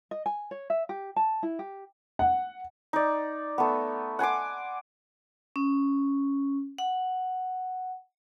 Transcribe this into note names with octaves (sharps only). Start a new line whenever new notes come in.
D#5
G#5
C#5
E5
G4
A5
E4
G4
F#5
D#4 D5
A3 B3
F#5 G#5 C6 D6
C#4
F#5